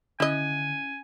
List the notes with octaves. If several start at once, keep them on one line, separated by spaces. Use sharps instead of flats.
D3 C#4 E4 D#5 G#5 F#6